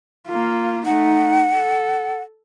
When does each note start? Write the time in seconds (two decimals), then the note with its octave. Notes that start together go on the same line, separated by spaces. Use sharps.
0.28 A#3 F4
0.86 A3 D#4 F#5
1.53 A4